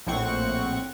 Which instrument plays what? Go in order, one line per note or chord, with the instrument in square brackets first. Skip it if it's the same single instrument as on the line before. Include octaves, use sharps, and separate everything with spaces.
[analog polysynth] A#1 A2 C4 F#5 C#6